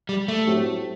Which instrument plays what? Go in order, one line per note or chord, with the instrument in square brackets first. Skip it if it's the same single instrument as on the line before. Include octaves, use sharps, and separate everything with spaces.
[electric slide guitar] G3
A3
[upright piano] A2 F#3 C4 G4